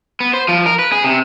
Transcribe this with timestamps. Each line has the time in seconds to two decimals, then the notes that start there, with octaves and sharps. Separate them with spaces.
0.20 B3
0.34 C5
0.48 F3
0.66 A#4
0.79 B4
0.92 G#4
1.04 C3